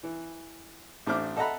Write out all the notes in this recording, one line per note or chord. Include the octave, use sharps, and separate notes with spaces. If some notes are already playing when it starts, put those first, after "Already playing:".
E3
A1 A3 D4 C5 D6 F6
A4 D#5 E5 F#5 A#5 B5